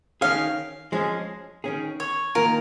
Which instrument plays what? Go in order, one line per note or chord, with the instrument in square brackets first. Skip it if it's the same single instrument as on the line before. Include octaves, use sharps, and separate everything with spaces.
[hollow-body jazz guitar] D#3 C#4 G#4 [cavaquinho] F5
[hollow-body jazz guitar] F3 G#3 C#4 G#4
D#3 C#4 G#4
[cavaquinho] C#5
[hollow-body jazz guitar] D#3 A#3 F4 [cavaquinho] A#4